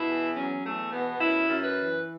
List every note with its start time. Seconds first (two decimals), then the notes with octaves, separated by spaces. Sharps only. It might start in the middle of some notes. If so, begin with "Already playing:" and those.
Already playing: B2 E4
0.08 E2
0.36 F#3 C#4
0.64 E2 A3
0.92 B2 B3
1.20 F#2 E4
1.49 F#2
1.63 B4
1.78 E3